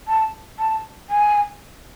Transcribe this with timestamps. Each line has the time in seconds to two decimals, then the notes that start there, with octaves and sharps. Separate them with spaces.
0.08 A5
0.59 A5
1.10 G#5